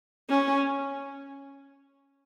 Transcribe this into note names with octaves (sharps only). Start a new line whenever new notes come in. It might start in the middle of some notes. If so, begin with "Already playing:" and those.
C#4